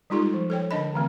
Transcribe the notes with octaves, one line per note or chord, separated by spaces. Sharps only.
G3 G#3 D#4 F4 G4 A4
F3
A4 C#5 G5
D3 D4 D#5 B5
D3 E3 A3 C4